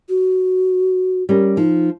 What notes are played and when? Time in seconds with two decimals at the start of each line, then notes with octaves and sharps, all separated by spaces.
0.09 F#4
1.29 G3 C#4 A#4
1.57 F3 D#4